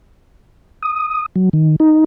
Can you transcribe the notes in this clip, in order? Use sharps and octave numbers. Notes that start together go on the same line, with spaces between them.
D#6
F#3
D#3
D#4